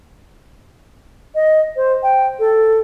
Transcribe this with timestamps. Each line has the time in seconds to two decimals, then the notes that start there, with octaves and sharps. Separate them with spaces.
1.35 D#5
1.76 C5
2.03 G5
2.39 A4